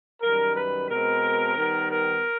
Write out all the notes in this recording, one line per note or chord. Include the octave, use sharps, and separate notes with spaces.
F#2 D#3 G3 A#4
B4
B2 G#3 C4 A#4
D#3 G3 B3
A#4